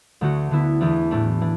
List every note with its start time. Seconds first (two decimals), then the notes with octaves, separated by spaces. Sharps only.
0.21 D2 D3 A3 F#4
0.51 D3 B3 E4
0.81 E2 E3 D4
1.11 A2 A3 D4
1.41 E3 D4